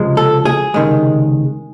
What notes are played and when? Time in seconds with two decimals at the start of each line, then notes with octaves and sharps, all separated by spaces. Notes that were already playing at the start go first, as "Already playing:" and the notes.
Already playing: C#2 C3 F3 G#3
0.17 A4
0.45 G#4
0.74 C#2 C3 D#3 G#3